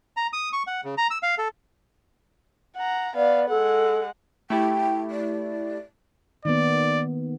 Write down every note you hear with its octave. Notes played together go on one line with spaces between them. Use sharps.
A#5
D#6
C#6
F#5
C#3
A#5
E6
F5
A4
F#5 A#5
B3 D5 F5
G#3 A4 F#5
A3 E4 G4 G5
D5
D#3 A#3 B3 D5